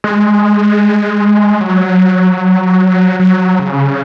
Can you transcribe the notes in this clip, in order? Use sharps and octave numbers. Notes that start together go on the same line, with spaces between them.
G#3
F#3
F#3
C#3